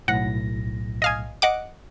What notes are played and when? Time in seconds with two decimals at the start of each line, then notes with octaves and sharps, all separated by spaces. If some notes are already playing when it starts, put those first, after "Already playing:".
0.08 B1 A2 F#5 A#6
1.02 D#5 F5 G#5
1.42 D#5 F#5 D6